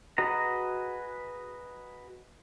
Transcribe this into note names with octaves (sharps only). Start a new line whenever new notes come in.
F#4 G#4 B4 D#5 A#5